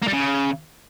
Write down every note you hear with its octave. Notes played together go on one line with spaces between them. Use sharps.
A#3
G3
C#3